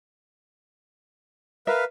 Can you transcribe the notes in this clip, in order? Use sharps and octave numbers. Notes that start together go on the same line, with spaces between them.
A#4 B4 E5 F5